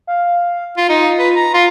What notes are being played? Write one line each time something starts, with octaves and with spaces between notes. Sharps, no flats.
F5
F4
D#4 F4
B4
A#5
F4 C6